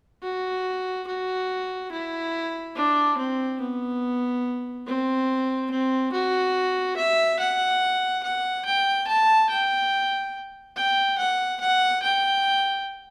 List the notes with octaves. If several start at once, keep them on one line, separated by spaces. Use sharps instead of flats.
F#4
F#4
E4
D4
C4
B3
C4
C4
F#4
E5
F#5
F#5
G5
A5
G5
G5
F#5
F#5
G5